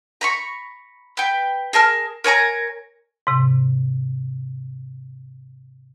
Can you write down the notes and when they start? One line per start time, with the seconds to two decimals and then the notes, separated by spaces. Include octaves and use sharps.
0.21 A#5 B5 C#6
1.17 B4 G5
1.73 G#4 A#4 A5 F6
2.24 A#4 C#5 G#5 A#5
3.27 G#2 C3